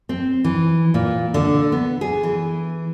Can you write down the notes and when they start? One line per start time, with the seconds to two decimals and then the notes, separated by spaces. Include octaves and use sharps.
0.09 C4
0.44 E3
0.94 A#2
1.34 D3
1.72 B3
2.01 G#4
2.23 E3